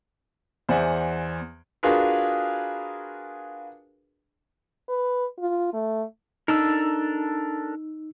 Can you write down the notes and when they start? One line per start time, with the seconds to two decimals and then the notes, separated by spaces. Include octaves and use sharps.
0.69 E2 C5 D5 E5 F#5 G#5
1.83 D4 F4 F#4 G#4 A#4 B4
4.89 B4
5.39 F4
5.74 A3
6.48 D4 D#4 A4 A#4 E6